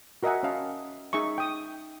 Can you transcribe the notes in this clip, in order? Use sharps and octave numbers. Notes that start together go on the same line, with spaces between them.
F#4 A#4 D#5 E5 F#5 G#5
C#4 D#5 F5 A5
D#4 G#4 E5 C#6
G5 D#6